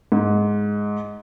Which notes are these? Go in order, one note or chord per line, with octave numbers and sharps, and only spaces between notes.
G#2